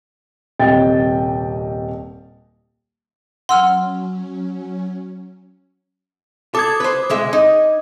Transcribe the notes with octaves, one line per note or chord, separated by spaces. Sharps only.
D#1 C2 D#5 G5 A6
F#3 C#4 F#5 C6 E6 F6
A4 D6 D#6 G#6
B4 C5
B1 G#3 E5
D#4 D#5